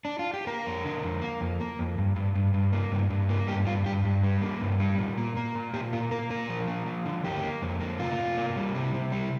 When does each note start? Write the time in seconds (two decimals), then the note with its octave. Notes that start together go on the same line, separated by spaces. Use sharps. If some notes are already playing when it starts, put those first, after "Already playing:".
0.05 D4
0.19 F4
0.34 G4
0.47 A#3 A#4
0.66 F2
0.85 D3
1.03 F2
1.22 A#3
1.41 F2
1.60 A#3
1.79 F2
1.98 G2
2.16 G2
2.35 G2
2.54 G2
2.72 A#3
2.91 G2
3.10 G2
3.29 A#3
3.48 G2 G4
3.67 G2 F4
3.86 G2 G4
4.05 G2
4.24 G3
4.42 A#3
4.61 G2
4.80 G3
4.98 A#2
5.18 A#3
5.36 A#3
5.55 A#2
5.74 A#2 G4
5.93 A#3 F4
6.11 A#3 A#4
6.30 A#2 A#4
6.49 F3
6.68 A#3
6.87 F3
7.06 D3
7.24 A#3 G4
7.43 A#3
7.62 F2
7.80 A#3
7.99 C3 F4
8.18 C3
8.38 A#3
8.56 G3
8.75 C3
8.94 C3
9.12 G3